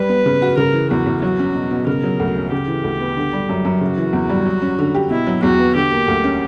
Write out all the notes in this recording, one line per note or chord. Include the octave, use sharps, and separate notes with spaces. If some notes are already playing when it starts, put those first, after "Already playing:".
Already playing: G3 B4
B3
C#3
F#4
C#3 A#4
E3
E2 F#4
E2
F#3 F#4
C#4
B2
B2
C#3 A#4
F#3
D2
C#4
C#3 G4
E3
D2
B3
D3
G3
F#2
F#2
C#3 F#4
E3
E2
G3
F#3
C#4
D3
G4
B2 E4
F#3
E2 F#4
B3
D3 G4
A#3
D2
C#4